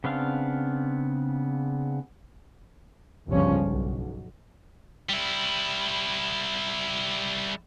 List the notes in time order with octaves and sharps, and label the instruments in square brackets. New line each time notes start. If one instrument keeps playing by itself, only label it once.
[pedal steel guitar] C#3 B3 C4 D4 F5
[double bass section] G1 C#2 G2 F3 C#4
B1
[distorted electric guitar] G3 E4